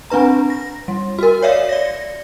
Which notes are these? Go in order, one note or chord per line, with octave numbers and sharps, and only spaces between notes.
C4 D4 B4 A#5
A#6
G3
F#4 A#4
C#5 D5 E5 F5
D5 A#6